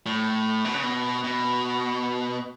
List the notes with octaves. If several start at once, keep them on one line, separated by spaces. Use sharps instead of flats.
A2
B2
C#3
B2
B2